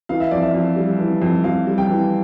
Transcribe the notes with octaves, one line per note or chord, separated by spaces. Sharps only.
E3 F5
E5
F2 D5
E5
F2
G3
E3
F2
F2 F5
G3
G5
E3